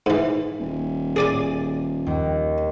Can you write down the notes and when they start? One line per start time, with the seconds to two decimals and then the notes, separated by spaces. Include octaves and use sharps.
0.06 G#2 E3
0.59 D#1
1.16 G#4 D5 G#5
2.06 D#2